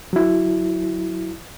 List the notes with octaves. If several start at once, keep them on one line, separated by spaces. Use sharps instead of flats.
F#3 E4